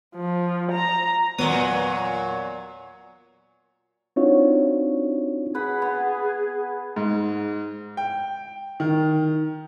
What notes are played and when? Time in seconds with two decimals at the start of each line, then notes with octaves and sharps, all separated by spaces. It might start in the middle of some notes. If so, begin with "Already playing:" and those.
0.16 F3
0.72 A#5
1.38 E2 A#2 F#3 B3 D#6
4.16 C4 D4 D#4 F4 F#4 C#5
5.55 G#4 B4 F#5 B5
5.82 B3
6.96 G#2
7.97 G5
8.80 D#3